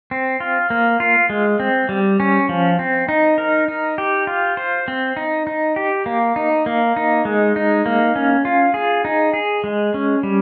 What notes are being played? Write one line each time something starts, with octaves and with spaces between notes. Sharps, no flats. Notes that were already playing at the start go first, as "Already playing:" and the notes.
C4
F4
A#3
F4
G#3
C4
G3
C#4
F3
C4
D#4
A#4
D#4
G4
F4
C5
C4
D#4
D#4
G4
A#3
D#4
A#3
D#4
G#3
D#4
A#3
C#4
F4
G#4
D#4
G#4
G#3
C#4
G3